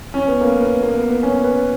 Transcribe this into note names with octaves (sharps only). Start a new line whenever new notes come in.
C#4
B3
A#3
B3
A#3
B3
B3
C#4
B4